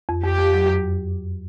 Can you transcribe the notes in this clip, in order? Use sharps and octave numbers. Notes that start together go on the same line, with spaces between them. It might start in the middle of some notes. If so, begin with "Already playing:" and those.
F2
F2 G4
F2
F#3
F#2